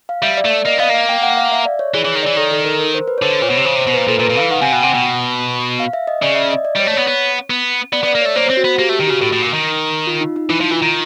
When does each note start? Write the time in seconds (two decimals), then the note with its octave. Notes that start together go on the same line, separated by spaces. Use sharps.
0.09 F5
0.22 G3 E5
0.37 D5
0.45 A3
0.51 D5
0.65 A#3 D#5
0.78 B3 F5
0.89 A#3
0.94 F5
1.09 G5
1.23 F#5
1.37 F5
1.52 E5
1.65 D5
1.79 C#5
1.94 E3 G#4
2.05 E3 C#5
2.15 D#3
2.23 D5
2.26 E3
2.37 D#3 A4
2.51 A4
2.65 A#4
2.79 A#4
2.94 C5
3.08 B4
3.18 C#5
3.22 D3 C5
3.42 A#2 C#5
3.50 B2
3.57 C3
3.65 C#3 C5
3.76 C3
3.79 C5
3.87 B2
3.93 B4
3.97 A#2
4.08 A#2 A4
4.19 A#2
4.22 B4
4.30 A#2
4.37 F5
4.40 E3
4.51 D#3 F#5
4.61 C3 G#5
4.72 B2 G5
4.83 C3 F#5
4.94 B2
5.80 F5
5.93 E5
6.07 D#5
6.22 C#3 D5
6.36 E5
6.51 D#5
6.65 D5
6.76 G3 C#5
6.87 A3
6.94 B3 C#5
7.07 B3
7.50 B3
7.92 B3 D5
8.03 B3
8.07 D5
8.15 A#3
8.21 C#5
8.25 A3
8.36 A#3 C5
8.46 C5
8.50 C4
8.57 F#4
8.65 B3
8.79 A#3 G4
8.89 A3
8.93 G4
9.00 D#3
9.07 C#3 F#4
9.22 A2
9.33 A2
9.42 A#2
9.54 D#3
10.07 F4
10.21 D#4
10.36 D#4
10.50 E3 E4
10.61 F3
10.71 E3 F4
10.82 D#3